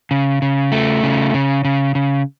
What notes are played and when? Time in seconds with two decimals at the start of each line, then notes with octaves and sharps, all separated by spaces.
0.11 C#3
0.42 C#3
0.72 A3
1.03 C#3
1.34 C#3
1.65 C#3
1.95 C#3